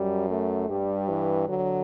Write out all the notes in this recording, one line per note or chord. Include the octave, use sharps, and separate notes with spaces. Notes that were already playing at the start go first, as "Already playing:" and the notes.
Already playing: F#2 G3
A3
G2 G3
E3
D3 F#3